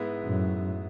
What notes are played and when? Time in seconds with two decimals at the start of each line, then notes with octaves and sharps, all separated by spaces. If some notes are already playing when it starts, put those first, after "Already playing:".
Already playing: G#2 G#3 B3 E4 B4
0.25 F#2 A2